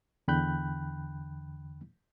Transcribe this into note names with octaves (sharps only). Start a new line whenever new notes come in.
E2 D3 G5 B5 F#6 G6